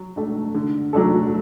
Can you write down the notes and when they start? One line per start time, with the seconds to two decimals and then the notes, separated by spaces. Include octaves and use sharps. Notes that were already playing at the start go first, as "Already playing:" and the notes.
Already playing: F#3
0.16 A3 D4
0.54 D3
0.93 F#3 A3 D4 A4